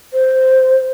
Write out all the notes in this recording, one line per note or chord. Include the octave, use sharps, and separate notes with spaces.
C5